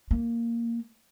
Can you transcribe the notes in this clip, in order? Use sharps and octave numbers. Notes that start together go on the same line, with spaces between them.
A#3